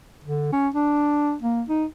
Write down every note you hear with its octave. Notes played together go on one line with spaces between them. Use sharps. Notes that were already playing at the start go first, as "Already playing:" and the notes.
D3
C#4
D4
A#3
D#4